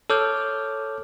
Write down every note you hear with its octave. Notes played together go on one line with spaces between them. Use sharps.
A4 C#5 D6 F6 G6